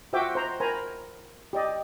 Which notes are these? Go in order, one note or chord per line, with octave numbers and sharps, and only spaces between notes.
F4 F#4 C5 E5 G5 D6
C5 A#5
A#4 C5 G#5 A#5 B5
G4 D5 D#5